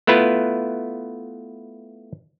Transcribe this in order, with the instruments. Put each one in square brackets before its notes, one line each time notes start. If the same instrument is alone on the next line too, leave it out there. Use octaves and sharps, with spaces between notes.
[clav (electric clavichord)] A3 B3 E4 F4 B4